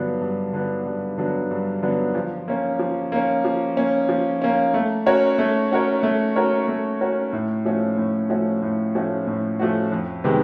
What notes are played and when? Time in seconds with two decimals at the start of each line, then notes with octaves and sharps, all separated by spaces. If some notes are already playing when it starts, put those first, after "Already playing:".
Already playing: G2 D3 F#3 B3 D4
0.21 G2
0.53 D3 F#3 B3 D4
0.86 G2
1.18 D3 F#3 B3 D4
1.51 G2
1.82 D3 F#3 B3 D4
2.15 F3
2.48 A#3 C#4
2.79 F3
3.12 A#3 C#4
3.45 F3
3.77 A#3 C#4
4.09 F3
4.42 A#3 C#4
4.74 A3
5.06 C#4 F#4 A#4 C#5
5.38 A3
5.71 C#4 F#4 A#4 C#5
6.03 A3
6.36 C#4 F#4 A#4 C#5
6.68 A3
7.01 C#4 F#4 A#4 C#5
7.33 A2
7.65 F3 A3 C#4 F#4
7.98 A2
8.30 F3 A3 C#4 F#4
8.62 A2
8.95 F3 A3 C#4 F#4
9.27 A2
9.59 F3 A3 C#4 F#4
9.92 F2
10.24 C3 D#3 G#3 B3